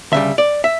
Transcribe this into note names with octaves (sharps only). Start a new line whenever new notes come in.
D2 C#3 G3 E5
D5
E5